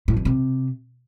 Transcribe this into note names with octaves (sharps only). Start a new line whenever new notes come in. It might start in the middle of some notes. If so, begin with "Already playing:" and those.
A2
F2
C3